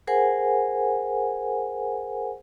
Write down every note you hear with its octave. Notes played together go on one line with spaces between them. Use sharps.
G#4 A#4 C5 F#5 G#5